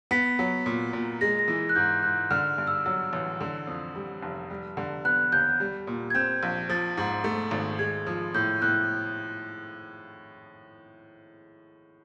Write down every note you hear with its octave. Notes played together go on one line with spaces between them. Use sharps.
B3 B6
F#3
A#2
A#2
G#3 A#6
A#6
E3
F#6
G#2 G6
G#2 F#6
D3 F6
G2
E6
F#3 E6
A1
D3
F2
G3
F1
G3
D3
B3 F#6
D#2 G6
G3
A#2
G#6
C4 G6
A#1
F3 A6
G#2
A3
G#1
G#3 G#6
F3
A2 G6
A2 F#6